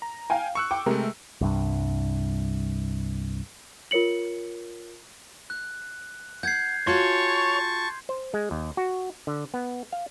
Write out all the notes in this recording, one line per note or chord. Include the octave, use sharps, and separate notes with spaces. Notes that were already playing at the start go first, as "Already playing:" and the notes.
A#5
F5 G5 G#5
C#6 E6 F#6 C#7
G5 D6
C3 G#3 A3 A#4
C2 G2
F4 A#4 C#5 C#7 F#7
F#6
F#5 G6 G#6 C7
F4 F#4 G#4 C#5 A5 C6 C#6
C5
G#3
D#2
F#4
D3
B3
F5